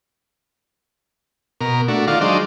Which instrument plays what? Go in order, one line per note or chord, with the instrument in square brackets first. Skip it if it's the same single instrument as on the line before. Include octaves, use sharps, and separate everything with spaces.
[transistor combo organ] B2 A#4
A3 D4 F#4
D#3 F4 D5 F5 F#5
F#3 G#3 D4 D#4 C5 D5